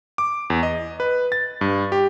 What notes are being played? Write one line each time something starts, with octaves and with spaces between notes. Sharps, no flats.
D6
E2
D#5
B4
A6
G2
G4